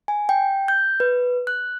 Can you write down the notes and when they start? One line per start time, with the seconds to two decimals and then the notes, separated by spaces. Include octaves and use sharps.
0.08 G#5
0.29 G5
0.68 G6
1.00 B4
1.47 F#6